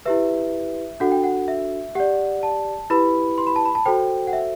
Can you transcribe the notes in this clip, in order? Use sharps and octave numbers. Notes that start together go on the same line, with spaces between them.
E4 G4 B4 E5
D4 F#4 A4 F#5
G5
F#5
E5
G4 D5 F#5
A5
E4 G4 B4 B5
C6
B5
A5
B5
A5
F#4 A4 C5 G5
F#5
E5